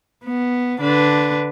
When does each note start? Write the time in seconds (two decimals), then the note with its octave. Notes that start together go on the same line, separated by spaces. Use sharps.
0.24 B3
0.79 D3 D4 B4